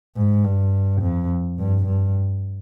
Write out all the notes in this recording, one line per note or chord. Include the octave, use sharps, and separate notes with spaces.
G#2
G2
F2
G2
G2